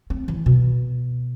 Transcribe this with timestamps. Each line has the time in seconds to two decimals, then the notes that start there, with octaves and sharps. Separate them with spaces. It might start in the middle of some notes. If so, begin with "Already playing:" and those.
0.10 C4
0.28 E3
0.46 B2